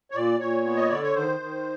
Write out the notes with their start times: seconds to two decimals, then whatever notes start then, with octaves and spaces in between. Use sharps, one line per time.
0.11 C#5
0.15 A#2 D5
0.40 A#2 C#5
0.65 B3
0.77 D#5
0.89 D3 D5
1.02 C#5
1.15 D#3 C5
1.40 D#3